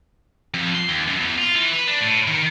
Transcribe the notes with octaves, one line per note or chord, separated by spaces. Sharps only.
F2
C6
D#2
F#2
E2
F4
E3
B4
D4
A2
D#3